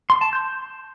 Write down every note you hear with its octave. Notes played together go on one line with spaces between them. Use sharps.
C6
A5
G6